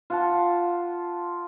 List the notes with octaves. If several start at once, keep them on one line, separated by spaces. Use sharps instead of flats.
F4 F#5 A5